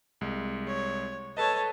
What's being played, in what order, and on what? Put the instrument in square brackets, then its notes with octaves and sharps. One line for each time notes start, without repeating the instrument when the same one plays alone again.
[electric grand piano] C2 G#3
[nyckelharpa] C#5
[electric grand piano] A4 B4 D#5 [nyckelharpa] C#5 A5